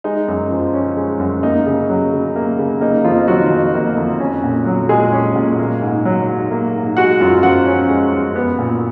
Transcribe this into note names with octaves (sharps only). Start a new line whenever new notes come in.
G#3 D#4
F#2
F3
C#4
G#3
F#2
A#3 D#4
C#3
F#3
C#3
A#3
C#3
A#3 D#4
F2 F3 F4
D#3 F#3 F#4
F2
A#3
F2
C#4
A#2
F#3
A#2 G#3 G#4
C#4
A#2
A#3
G#2
F#3
G#2
A#3
G#2
G#3 F#4 F#5
F#2 F4 F5
F3 F#4 F#5
C#4
G#3
F#2
B3
A#2